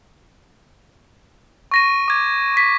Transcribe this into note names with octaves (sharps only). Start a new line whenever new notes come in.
C#6 A#6 D#7
D6 G#6
B6